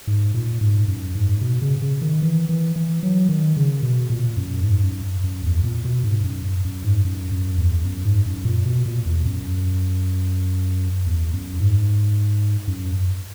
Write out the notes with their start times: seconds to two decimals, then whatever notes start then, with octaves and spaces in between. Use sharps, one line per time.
0.07 G#2
0.34 A#2
0.61 G#2
0.88 F#2
1.15 G#2
1.41 B2
1.62 C#3
1.82 C#3
2.02 D#3
2.22 E3
2.49 E3
2.76 E3
3.03 F#3
3.29 D#3
3.57 C#3
3.83 B2
4.10 A#2
4.37 F#2
4.63 G#2
4.83 F#2
5.24 F#2
5.44 E2
5.64 A#2
5.84 B2
6.04 G#2
6.24 F#2
6.65 F#2
6.84 G#2
7.05 F#2
7.32 F#2
7.58 E2
7.85 F#2
8.05 G#2
8.26 F#2
8.45 A#2
8.65 B2
8.85 A#2
9.06 E2
9.26 F#2
11.06 E2
11.33 F#2
11.60 G#2
12.68 F#2